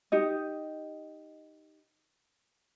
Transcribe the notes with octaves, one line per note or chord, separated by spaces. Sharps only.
D#4 G4 D#5